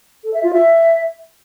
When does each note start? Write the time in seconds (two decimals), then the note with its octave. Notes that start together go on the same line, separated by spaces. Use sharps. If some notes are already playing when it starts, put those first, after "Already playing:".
0.23 A4
0.33 E5
0.43 F4
0.53 E5